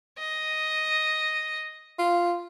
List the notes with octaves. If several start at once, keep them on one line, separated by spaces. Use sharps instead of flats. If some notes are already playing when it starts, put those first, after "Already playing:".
D#5
F4